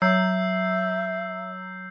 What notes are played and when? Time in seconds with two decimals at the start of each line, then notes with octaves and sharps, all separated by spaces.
0.02 F#3 E5 E6 G6 C7